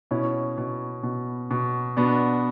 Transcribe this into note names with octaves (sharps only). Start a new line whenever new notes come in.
B2 C#4 E4
B2
B2
B2
B2 B3 D4